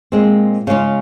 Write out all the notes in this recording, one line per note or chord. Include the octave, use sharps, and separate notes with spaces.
A#2 G#3 C4
C#3 G#3 C#4 F4